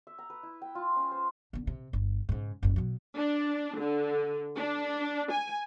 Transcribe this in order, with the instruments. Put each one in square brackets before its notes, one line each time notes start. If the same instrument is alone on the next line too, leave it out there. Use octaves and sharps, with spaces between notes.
[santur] E5
A#5
B4
E4
G5
F4
C#4
C5
[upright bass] D3 B3
C3
G1
G#2 C#3
F#1 G#2
B2 F#3
[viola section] D4
D3
D4
G#5